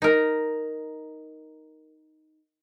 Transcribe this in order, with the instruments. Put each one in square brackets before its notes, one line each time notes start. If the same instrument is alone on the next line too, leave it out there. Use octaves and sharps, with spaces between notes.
[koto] D#4 A#4